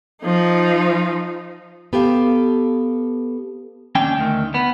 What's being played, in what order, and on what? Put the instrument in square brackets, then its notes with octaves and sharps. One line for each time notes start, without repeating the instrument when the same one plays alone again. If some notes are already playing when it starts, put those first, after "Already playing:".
[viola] F3 D#4
[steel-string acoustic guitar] B3 G4 A4 F5
[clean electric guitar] D#2 C#4 D4 G5
D2 D#3
B3